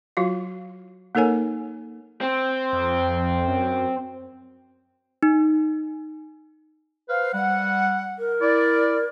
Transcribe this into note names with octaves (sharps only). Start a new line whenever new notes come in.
F#3 F4 F#4 F5
A#3 D#4 A4 A#4 C#5 G#5
C4
F2
F#2
D#4
B4 C5 F5
G3 F#5
A#4
E4 D5